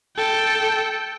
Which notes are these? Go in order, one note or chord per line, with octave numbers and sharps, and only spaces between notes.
A4 G5